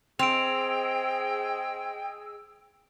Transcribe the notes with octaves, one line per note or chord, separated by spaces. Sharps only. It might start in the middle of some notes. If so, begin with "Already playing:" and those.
C4 G#4 D#5 G5 E6 D7 F7